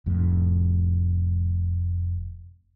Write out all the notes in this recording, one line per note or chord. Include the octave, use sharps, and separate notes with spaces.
F1 F2 A2